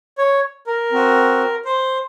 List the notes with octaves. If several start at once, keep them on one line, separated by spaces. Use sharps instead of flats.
C#5
A#4
C4 F#4
C5